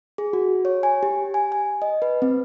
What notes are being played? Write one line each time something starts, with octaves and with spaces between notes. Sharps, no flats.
G#4
F#4
C#5
G#5
G4
G#5
G#5
D#5
B4
C4